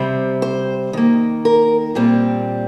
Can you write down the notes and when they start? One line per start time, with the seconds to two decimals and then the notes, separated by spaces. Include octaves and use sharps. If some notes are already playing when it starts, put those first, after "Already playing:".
Already playing: C3 G3 C4
0.42 C5
0.93 D#3 A#3
1.45 A#4
1.95 A#2 G3 C4